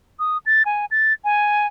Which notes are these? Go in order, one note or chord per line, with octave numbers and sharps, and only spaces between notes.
D#6
A6
G#5
A6
G#5